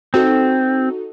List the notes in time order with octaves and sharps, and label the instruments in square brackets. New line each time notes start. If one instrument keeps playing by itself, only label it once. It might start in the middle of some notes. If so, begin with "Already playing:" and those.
[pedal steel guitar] C4 [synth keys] D#4 F#4 A4